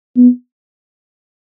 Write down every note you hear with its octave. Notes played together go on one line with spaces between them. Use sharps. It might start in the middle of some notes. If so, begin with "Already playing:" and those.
B3